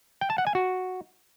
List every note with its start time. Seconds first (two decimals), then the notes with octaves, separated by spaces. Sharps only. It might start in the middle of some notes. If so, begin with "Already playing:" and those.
0.21 G5
0.30 A5
0.38 F#5
0.47 G#5
0.55 F#4